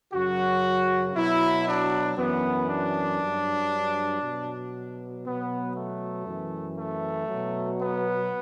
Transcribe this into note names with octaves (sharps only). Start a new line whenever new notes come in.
F#2 C#3 F#3 F#4
B2 F#3 E4
D4
F#2 E3 B3
D4
G2 F#3
B2 F#3
B2 F#3 B3
A3
F#2 E3
A3
B2 F#3
B3